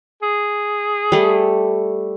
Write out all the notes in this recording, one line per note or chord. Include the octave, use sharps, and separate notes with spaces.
G#4
G3 A3